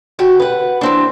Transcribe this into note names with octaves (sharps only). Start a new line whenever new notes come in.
D3 F#4 G4
B4 F#5
E3 C4 D4